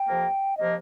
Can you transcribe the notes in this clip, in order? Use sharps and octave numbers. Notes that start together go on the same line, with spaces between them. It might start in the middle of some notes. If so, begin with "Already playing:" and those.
Already playing: G5
F2 C3 F3 A#3
C3 F3 A#3 D#5